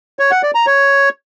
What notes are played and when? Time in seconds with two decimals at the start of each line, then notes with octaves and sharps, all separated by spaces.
0.19 C#5
0.31 F#5
0.43 D5
0.55 A#5
0.67 C#5